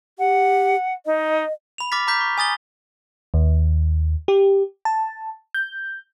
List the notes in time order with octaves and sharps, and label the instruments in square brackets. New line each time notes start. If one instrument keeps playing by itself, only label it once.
[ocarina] G4 [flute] F#5
[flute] D#4 [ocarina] D#5
[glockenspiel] B5 F7
B5 D6 F6 A6 B6
A#5 D6 F6 G6 B6
C#6
G#5 D#6 A6 G7
[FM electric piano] D#2
G4
A5
G6